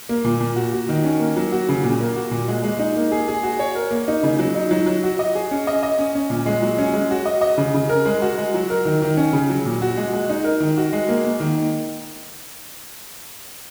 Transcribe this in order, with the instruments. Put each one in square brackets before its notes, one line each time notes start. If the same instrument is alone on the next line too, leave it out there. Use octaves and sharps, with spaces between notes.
[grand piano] A#3
A#2
A#2
F#4
F#4
D#3
C#4
A#3
F#3
F#4
C#3
A#2
A#3
F#4
A#2
G#3
G#3
D#4
A#3
G#4
G#4
F#4
C#5
A#4
A#3
D#4
C#3
F#3
D#4
F#3
F#3
F#4
D#5
G#4
C#4
D#5
D#5
C#4
C#4
A#2
G#3
F#3
C#4
G#3
F#4
D#5
D#5
C#3
C#3
A#4
G#3
F#4
G#3
F#3
A#4
D#3
D#3
C#4
C#3
F#3
A#2
F#4
G#3
G#3
D#4
A#4
D#3
F#4
G#3
A#3
A#3
D#3